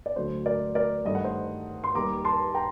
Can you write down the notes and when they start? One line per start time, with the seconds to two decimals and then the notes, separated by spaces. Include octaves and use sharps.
0.06 D5
0.16 D2 D3 F#3 A3 C5
0.46 A#4 D5
0.75 A#4 D5
1.05 G2 D#3 A3 D#5
1.15 F#5
1.24 C5 D#5
1.84 C6
1.95 D#2 D#3 G3 A#5 D6
2.25 A5 C6
2.55 G5 A#5